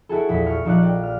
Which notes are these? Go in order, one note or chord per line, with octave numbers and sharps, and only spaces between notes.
E4 F#4 G#4 A4
A#1 E2 A4 B6
C#6 F6 C#7
A#1 F3 D#4 D5 F5 F#6
D5 G5
F6